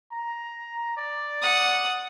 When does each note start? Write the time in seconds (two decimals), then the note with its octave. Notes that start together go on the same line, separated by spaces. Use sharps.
0.12 A#5
0.97 D5
1.42 F#5 D#6